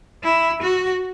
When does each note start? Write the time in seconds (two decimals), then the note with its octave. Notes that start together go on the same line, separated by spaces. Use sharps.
0.24 E4
0.62 F#4